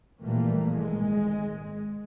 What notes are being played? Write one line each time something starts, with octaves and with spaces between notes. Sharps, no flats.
A#2 E3 F3 G3 A3 A#3
G#1 G#3